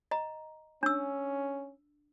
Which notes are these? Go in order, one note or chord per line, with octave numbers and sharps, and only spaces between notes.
D#5 A#5
C#4 D4 E6